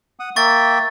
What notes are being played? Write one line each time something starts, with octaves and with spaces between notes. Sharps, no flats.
F#5 D#6
A#3 E5 G5 C#6 A6